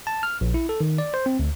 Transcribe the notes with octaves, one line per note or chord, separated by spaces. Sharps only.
A5
F6
A#1
E4
A4
D#3
D5
C5
C4
D2